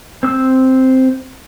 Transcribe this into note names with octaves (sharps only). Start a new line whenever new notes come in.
C4 E6